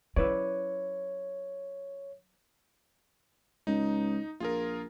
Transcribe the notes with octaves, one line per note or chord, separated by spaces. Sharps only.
F#3 C#4 E4 B4 C#5 D5
C#2 D#4
A#1 F4 G#4 A#4